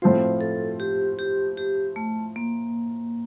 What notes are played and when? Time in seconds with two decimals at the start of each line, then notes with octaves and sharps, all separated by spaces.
0.02 A2 F3 C4 F4 C5
0.41 A4
0.80 G4
1.19 G4
1.58 G4
1.96 A3
2.36 A#3